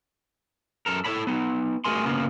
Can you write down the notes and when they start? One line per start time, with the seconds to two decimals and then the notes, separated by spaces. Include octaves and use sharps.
0.86 F#2 A4 A#4
1.05 E4 A4 C5 C#5 A5 B5
1.27 B3 D#4
1.85 A3 F#4 G#4 A#4 G#5 C6
2.06 C#3 A#3 B3 F4